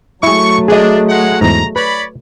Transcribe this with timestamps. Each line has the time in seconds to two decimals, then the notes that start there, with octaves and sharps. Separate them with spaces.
0.23 F#3 A3 E4 G#4 C#6
0.68 D4 G#4 D#5 G#5
1.09 G#3 F#5
1.41 E2 G#2 A#5
1.76 B4 C#5 D5 B5